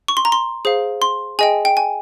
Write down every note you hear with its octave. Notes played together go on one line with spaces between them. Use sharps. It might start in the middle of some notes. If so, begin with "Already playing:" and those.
C#6
C6
A#5
C6
G#4 C5 F5
C6
G#4 D#5 G5 G#5
G5
G#5